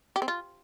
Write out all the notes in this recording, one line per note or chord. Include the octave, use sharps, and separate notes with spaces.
G4
C4
F4